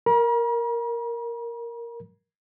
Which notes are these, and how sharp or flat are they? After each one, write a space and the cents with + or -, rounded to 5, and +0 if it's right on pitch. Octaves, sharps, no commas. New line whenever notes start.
A#4 +0 A#5 +45